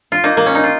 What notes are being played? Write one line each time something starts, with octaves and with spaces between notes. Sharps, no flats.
F4
A#3 D#4
A#3
C#4
D#4
F4